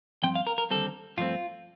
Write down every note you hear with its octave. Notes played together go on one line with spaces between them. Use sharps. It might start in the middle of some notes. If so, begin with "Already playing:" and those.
G2 F3 C4 G5
F5
A#4
A#4
D#2 D3 G3 C4 A4
G2 F3 A3 C4 F4